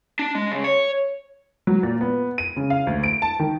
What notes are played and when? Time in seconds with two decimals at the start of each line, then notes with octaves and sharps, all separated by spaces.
0.19 D4
0.35 G#3
0.52 C#3
0.64 C#5
1.67 F#3
1.83 A#2
2.01 B3
2.38 D#7
2.56 C#3
2.70 F5
2.87 D2
3.03 D7
3.22 A5
3.40 D#3